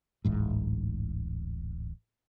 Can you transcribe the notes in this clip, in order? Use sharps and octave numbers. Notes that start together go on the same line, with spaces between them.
D1 A1 G#2